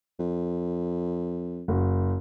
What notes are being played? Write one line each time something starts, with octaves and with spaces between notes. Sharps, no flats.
F2
F#1 F#4